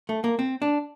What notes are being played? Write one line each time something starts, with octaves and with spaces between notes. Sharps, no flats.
A3
A#3
C4
D4